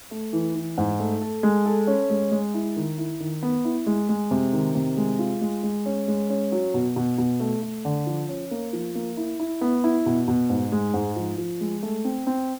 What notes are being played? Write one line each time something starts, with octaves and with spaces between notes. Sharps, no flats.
A3
E3
E3
G#2
A3
A4
G#3
A4
C#4
G#3
G#3
E4
D#3
E4
D#3
B3
E4
G#3
G#3
C3
D#3
C3
G#3
F4
G#3
G#3
C#4
G#3
C#4
F#3
B2
B2
B2
A3
A3
D3
F3
C#4
A#3
F3
A#3
E4
E4
B3
E4
B2
B2
G#2
G#3
G#2
F3
F3
G#3
A3
C4
C4